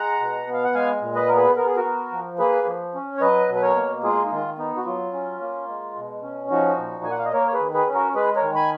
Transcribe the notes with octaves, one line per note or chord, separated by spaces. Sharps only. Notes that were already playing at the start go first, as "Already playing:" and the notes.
Already playing: G#3 F#5 A#5
B2
B3
F5
F#5
G#3 F5 G#5
A#2
B4 D#5
B3 A#4
G#4 B4
B3 A#4
G#4
F#4 A#4
B3
F3
A#3 G#4 B4
F3
C#4
C#5
F#3 B4 D#5
B2
B4
A#4 C#5
A#3
G#3 F4 G#4
D#4
D#3 F4
B3 D#4
F#4
F#3 F4
C#4
A#3
G#3
B2
C#4
F3 D#4 F#4
A#2
A#3 G#5
F#5
F5
D#5
A#3 A#4 C#5
C#5
G#4 B4
D#3
G#4 B4
C#4
F#4 A#4
G#3 G#4 B4
A#4 C#5
D#3
G#5 B5